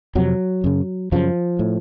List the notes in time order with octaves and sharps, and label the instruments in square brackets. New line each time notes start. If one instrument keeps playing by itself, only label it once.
[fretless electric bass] F2 C3 F#3
F#2 C#3
F#2 C#3 F3
A2